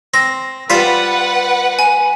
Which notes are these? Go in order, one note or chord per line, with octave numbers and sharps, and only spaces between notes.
C4 A#6
G3 F4 B4 C5 F#5 B6
G#5